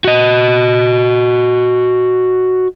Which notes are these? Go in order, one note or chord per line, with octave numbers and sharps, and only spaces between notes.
F#4 D#5